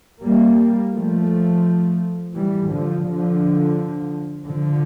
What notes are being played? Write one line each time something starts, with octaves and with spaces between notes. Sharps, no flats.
G3 A#3
F3 A3
E3 G3
D3 F3
D3 F3
D3 F3